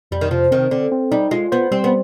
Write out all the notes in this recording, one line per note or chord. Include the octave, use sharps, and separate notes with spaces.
F2 G3
D#3
C3 F3
D#3 C4
D3 C4
C4
G3 D#4
G#3 F4
B3 C5
G3 C4
B3